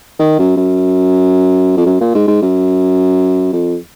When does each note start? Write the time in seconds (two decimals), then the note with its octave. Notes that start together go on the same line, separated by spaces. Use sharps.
0.19 D#3
0.39 F#2
0.57 F#2
1.77 F2
1.86 F#2
2.01 A#2
2.15 G#2
2.27 G#2
2.42 F#2
3.53 F2